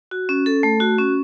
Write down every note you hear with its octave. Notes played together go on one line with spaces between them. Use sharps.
F#4
C#4
A4
A3
F#4
C#4